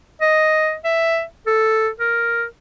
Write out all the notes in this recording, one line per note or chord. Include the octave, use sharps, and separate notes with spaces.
D#5
E5
A4
A#4